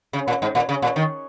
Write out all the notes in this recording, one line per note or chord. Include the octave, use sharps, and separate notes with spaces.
C#3
A#2
G#2
A#2
C#3
A#2
D#3